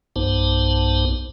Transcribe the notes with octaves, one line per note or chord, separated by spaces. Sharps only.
B1 G2 B3 D#4 C5 A5